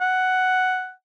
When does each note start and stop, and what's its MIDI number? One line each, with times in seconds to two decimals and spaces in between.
0.01 0.91 78